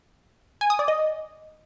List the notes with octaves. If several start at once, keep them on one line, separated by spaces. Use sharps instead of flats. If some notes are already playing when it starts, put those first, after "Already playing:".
G#5
D#6
D5
D#5